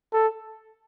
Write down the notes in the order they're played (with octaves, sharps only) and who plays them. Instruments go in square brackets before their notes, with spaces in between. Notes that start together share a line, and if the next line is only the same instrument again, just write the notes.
[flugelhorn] A4